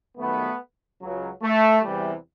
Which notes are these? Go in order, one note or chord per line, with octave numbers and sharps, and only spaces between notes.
F#2 D#3 G3 A3 B3
C#2 C#3 F#3
A3
E2 C3 E3 G3